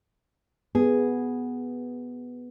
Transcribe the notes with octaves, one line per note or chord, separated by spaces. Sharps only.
B3 G#4